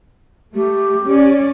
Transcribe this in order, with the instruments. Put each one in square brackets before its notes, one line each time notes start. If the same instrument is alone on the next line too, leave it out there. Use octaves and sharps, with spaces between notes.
[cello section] A3 [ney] G4
[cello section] C#4 D5